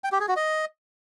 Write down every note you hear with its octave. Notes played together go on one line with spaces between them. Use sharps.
G5
G4
G#4
F#4
D#5